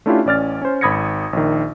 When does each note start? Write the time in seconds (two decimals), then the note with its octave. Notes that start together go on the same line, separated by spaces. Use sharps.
0.06 A3 C#4 D4 E4 F4 G4
0.25 A1 C#4 D5 F6 A6
0.62 C#4 C5
0.81 G#1 B5 D#6 G#6 A#6 C#7
1.33 A#1 D#3